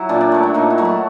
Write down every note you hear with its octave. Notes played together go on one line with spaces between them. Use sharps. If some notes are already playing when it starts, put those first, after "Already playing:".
Already playing: F#3 E4
A#2 D4
D4
F#3 A3
D4
A#2 D#4
E4
F#3 A3
E4